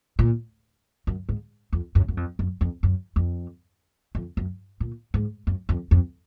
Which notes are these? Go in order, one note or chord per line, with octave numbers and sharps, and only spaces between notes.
A#2
F#2
G#2
F2
F#2
F#2
F2
F#2
F2
F#2
F2
F2
F#2
A#2
G#2
F#2
F2
F2